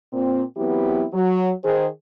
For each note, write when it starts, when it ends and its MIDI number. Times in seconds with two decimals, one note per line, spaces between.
0.13 0.42 46
0.13 0.42 60
0.57 1.04 52
0.57 1.04 54
0.57 1.04 59
0.57 1.04 60
0.57 1.04 64
0.57 1.04 67
1.13 1.51 54
1.64 1.86 51
1.64 1.86 68
1.64 1.86 72